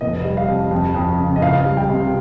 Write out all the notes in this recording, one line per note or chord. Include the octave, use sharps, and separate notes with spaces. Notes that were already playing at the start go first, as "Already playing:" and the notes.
F1 D#5
G3
F5
F2
F2
F2
C#3
D#5
C#2 F5
G3
G5
C3